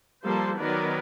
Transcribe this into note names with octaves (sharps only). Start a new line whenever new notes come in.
F3 G3 A#3 A4 C5
D#3 F#3 B3 A#4 B4 D5